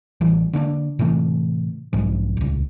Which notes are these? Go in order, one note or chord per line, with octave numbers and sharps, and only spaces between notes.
A1 E3 G3
D3 A#3 C#4 D4
A2 C3 E3 A3
B1 G#2 F3
D#1 C#2